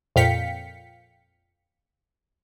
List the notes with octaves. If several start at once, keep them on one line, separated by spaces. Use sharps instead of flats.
F2 A#2 F5 G5 B6 C#7